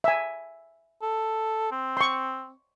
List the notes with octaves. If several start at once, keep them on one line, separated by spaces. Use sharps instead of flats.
E5 G#5
A4
C4
C6 C#6